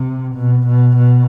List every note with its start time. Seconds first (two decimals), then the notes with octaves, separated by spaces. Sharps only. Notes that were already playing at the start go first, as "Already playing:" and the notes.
Already playing: C3
0.35 B2
0.67 B2
0.97 B2